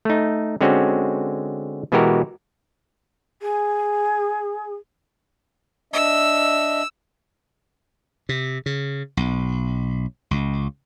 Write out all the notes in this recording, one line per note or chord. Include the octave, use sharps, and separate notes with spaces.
A3 D#4
D3 G#3 C4 C#4 F#4
B2 E3 G#3 F#4 G4 A#4
G#4
D4 D#5 E5 E6
C3
C#3
B1
C#2